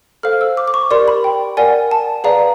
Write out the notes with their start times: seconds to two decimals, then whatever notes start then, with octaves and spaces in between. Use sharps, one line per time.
0.23 A4 C5 F5 F6
0.41 E6
0.57 D6
0.68 D6
0.74 C#6
0.91 G4 A#4 D5 C6
1.08 B5
1.24 G5
1.57 A#4 D5 F#5 G#5
1.91 A5
2.24 G#4 B4 D5 F5 A#5